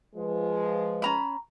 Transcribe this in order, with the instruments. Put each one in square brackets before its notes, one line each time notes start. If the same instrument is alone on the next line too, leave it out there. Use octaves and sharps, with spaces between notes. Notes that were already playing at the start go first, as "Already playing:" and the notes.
[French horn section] F3 G#3 [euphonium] B4
[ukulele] C#4 A#5 B5